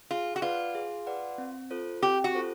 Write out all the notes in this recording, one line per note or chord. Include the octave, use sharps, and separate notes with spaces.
F4 G#4
F#4
F4 B4 D5 F#5
G#4
B4 D5 F#5
C4
F4 A4 C5
C4 G4
F#4
F4 A4 C5